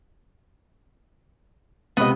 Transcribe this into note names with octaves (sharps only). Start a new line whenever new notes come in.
C#2 C3 B3 D#5